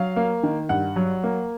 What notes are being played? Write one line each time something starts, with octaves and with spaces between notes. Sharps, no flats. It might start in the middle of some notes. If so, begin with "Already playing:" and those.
Already playing: F#3 F5
A#3
D#3
G2 F#5
F#3
A#3